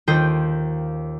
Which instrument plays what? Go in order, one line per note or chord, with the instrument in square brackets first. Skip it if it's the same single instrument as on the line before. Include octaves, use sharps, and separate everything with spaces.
[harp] D#2 D#3 F4 C5 G5 D#6